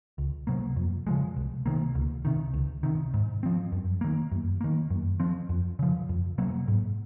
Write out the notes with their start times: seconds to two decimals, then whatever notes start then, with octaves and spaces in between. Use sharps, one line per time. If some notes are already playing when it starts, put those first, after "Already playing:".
0.18 C#2
0.47 C3 F#3 A#3
0.76 F2
1.07 C#3 F3 G#3
1.37 C2
1.66 C3 D#3 A#3
1.95 C#2
2.25 C3 D#3
2.54 C#2
2.83 C3 D#3
3.14 G#2
3.43 F3 C4
3.72 F#2
4.01 D#3 A#3
4.32 F#2
4.61 D#3 A#3
4.90 F#2
5.20 F3 C4
5.49 F2
5.79 C#3 F3
6.09 F2
6.38 C3 F#3 A#3
6.68 G#2